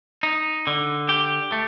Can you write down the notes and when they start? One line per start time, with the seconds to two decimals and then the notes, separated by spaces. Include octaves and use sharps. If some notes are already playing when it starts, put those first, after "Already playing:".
0.23 D#4
0.67 D3
1.09 G4
1.52 A3